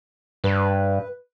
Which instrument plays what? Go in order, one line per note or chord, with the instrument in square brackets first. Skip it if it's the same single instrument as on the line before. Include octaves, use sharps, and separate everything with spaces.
[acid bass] G2 [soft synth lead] B4